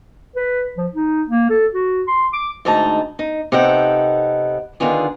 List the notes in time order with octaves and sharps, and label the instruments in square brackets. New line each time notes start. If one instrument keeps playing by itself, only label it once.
[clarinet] B4
F3
D#4
A#3
A4
F#4
C6
D6
[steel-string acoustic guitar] D2 G#2 D#4 E4 A5 A#5
D#4
C3 B3 D#4 A4 F#5 G5
D3 D#3 B3 F4 G#4